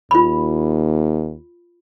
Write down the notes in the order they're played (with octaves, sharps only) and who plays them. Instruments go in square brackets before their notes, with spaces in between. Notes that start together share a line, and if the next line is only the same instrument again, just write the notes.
[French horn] D#2 [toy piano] F4 B5